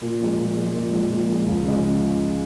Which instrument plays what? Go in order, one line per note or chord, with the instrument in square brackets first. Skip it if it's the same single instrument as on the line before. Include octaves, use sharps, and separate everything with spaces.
[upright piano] A#2
F3 G#3
A#2
F3 G#3
A#2
F3 G#3
A#2
F3 G#3
C#2
C#3 F3 G#3